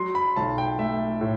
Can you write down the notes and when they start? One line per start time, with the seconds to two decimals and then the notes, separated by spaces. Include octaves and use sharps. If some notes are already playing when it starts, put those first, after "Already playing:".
Already playing: F#3 C6
0.15 B5
0.36 B1 A5
0.58 G5
0.79 A3 E5
1.21 A2